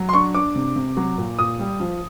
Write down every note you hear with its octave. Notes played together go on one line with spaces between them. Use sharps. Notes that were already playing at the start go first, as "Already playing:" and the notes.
Already playing: F#3
C6
D4 C#6
D4 D6
C3
C3
F#3
A#2
A#2 D#6
G3
F3